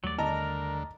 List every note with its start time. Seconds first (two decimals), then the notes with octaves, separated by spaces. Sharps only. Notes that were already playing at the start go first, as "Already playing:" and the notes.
0.04 D#2 F#3 G3 A3 D5
0.18 D3 A#4 D#5 A5 A#5